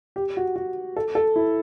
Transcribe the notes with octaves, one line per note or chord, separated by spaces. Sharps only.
G4
F#4
F#4
A4
A4
E4